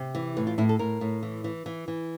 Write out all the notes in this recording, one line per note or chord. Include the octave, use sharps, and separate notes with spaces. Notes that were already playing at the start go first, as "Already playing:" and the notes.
Already playing: C3
E3
A2 B4
F4
A2 E4
A4
A2 A#4
A2
E3
E3
E3
E3